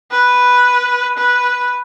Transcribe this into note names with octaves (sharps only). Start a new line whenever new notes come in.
B4
B4